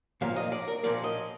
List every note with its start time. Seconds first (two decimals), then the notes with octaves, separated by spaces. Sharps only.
0.21 A#2 F3 A#3 F5
0.36 D#5
0.52 D5
0.68 A#4
0.83 A#2 F3 A#3 D5
1.04 D#5